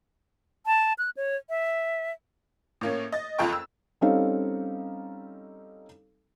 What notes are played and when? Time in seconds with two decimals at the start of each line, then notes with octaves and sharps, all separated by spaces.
0.66 A5
0.98 F#6
1.17 C#5
1.49 E5
2.81 A2 A#3 C#4
3.12 D#5 A6
3.38 F#1 F2 F4 A4 G5 C#6
3.53 E6
4.01 G3 C4 C#4 D#4 A4 F5